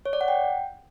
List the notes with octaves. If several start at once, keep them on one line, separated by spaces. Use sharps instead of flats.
C#5
D5
F#5
G5